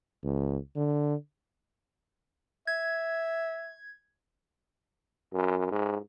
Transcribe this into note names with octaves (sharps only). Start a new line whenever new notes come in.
C#2
D3
E5 G#6
F#2
G#2